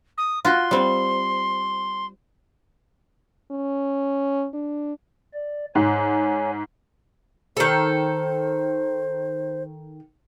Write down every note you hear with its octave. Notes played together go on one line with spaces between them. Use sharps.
D#6
F4 F#4 C6
G3 C4
C#4
D4
D5
G#2 C#5 G#5
D#3 A4 C5